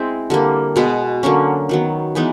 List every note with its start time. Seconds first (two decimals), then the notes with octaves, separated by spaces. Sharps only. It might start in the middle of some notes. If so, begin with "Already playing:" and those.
Already playing: G#3 C4 E4
0.30 D3 G3 A#3
0.76 B2 G#3 B3
1.23 D3 F#3 A#3 C#4
1.69 D#3 F#3 B3
2.15 E3 G#3 B3 D#4